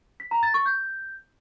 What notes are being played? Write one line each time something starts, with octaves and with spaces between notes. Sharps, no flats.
B6
A#5
A6
C#6
G6